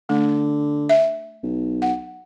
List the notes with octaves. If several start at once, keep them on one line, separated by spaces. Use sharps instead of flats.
D3 A3
E5
B1
F#5